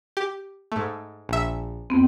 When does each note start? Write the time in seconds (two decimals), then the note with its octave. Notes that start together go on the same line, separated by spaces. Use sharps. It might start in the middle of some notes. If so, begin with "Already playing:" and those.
0.17 G4
0.72 G#2 A3
1.29 A#1 E5
1.90 F2 B3 C4